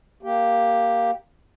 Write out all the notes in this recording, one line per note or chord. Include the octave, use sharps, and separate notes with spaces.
A#3 G4